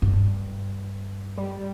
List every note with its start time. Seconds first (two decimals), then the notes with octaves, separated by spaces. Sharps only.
0.02 G2
1.37 G3